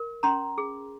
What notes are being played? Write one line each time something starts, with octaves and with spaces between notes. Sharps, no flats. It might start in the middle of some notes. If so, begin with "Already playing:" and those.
Already playing: A#4
C#4 A#5 C6
G#4